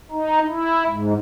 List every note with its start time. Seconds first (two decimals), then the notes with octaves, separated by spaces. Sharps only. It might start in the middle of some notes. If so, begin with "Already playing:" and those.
0.11 D#4
0.48 E4
0.87 G#2